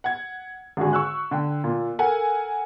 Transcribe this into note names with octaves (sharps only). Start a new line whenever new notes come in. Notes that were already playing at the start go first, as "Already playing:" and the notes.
F#5 G#6
G#1 D3 F#4 G#4
C#6 E6 F#6
D3 G5
A#2
A4 A#4 F#5 G#5